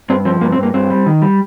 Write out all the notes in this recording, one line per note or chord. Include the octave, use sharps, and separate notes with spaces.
G2 C4
F3 C4
G2 A#3
C4
G2
A#3
G2 C4
G3
D#3
G3